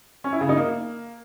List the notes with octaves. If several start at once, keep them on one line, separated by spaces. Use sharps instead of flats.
C#4
E4
C#3
D#4
A#3